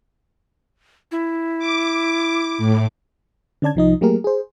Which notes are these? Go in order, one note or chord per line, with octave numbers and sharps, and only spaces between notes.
E4
D6
A2
D3 C#4 D5 A5 G#6
C2 F3 D#4 D#5
F#3 A3 A#3 G4 G#4 A#4
G#4 C5